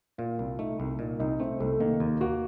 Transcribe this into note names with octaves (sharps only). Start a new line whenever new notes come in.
A#2 F4
C2
A3 D#4
C2
A#2 D#4
C2 D#4
A3 C4
C2 A3
D#3 A#3
D#2
A#3 F#4